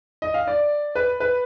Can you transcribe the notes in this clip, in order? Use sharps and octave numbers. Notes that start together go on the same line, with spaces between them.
D#5
F5
D5
B4
B4